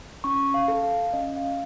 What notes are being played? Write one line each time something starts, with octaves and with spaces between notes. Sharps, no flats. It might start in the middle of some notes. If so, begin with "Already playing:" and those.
C#4 C#6
F5
A4
F5
C#4 D#5
F5